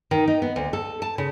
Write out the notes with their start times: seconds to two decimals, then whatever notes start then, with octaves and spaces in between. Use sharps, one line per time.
0.11 D#3
0.28 D#4
0.42 B3
0.56 D2
0.73 A4
1.02 A5
1.18 C#3